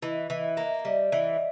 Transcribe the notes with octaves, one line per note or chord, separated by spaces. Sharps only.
E3 D#5
E3 D#5
A#3 E5
G3 D#5
E3 D5